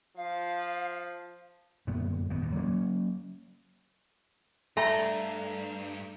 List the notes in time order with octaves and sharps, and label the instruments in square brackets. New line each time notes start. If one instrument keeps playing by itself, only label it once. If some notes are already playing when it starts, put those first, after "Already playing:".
[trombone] F3 [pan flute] F5
[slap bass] G1 F#2 A#2 B3
G#1 D#3 B3
D#2 A#2
F#3 A#3 B3 C#4
[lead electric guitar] G2 [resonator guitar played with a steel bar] A3 [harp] A#5